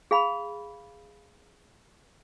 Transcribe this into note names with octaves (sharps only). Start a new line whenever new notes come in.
G#4 F5 B5